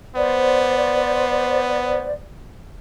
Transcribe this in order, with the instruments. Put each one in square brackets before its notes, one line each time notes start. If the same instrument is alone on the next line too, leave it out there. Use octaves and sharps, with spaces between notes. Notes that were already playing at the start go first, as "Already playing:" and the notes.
[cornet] B3 [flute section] C5 D5